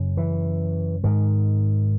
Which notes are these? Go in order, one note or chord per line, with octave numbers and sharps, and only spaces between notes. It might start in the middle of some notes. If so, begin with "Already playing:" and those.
Already playing: F#2 C#3
E3
G#2 D#3